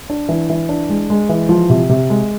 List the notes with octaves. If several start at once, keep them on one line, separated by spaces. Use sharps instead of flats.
D4
E3
E3
D4
G#3
G#3
E3
F3
C3
C3
G#3